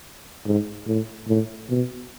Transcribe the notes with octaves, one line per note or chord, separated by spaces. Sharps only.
G#2
A2
A2
B2